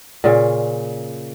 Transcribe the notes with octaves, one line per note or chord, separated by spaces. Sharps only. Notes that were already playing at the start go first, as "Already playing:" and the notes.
A#2 C#3